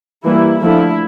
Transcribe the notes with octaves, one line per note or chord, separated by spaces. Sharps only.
E3 G3 A#3 E4
D3 F3 A3 E4